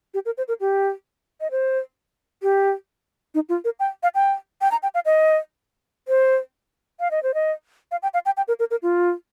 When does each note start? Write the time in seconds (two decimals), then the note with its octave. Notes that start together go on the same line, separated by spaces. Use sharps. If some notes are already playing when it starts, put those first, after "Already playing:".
0.14 G4
0.26 A#4
0.38 C5
0.48 A#4
0.61 G4
1.41 D#5
1.51 C5
2.43 G4
3.35 D#4
3.49 F4
3.65 A#4
3.80 G5
4.03 F5
4.15 G5
4.61 G5
4.72 A#5
4.83 G5
4.95 F5
5.06 D#5
6.08 C5
7.00 F5
7.11 D#5
7.23 C5
7.34 D#5
7.91 F5
8.03 G5
8.14 F5
8.26 G5
8.37 G5
8.48 A#4
8.59 A#4
8.71 A#4
8.83 F4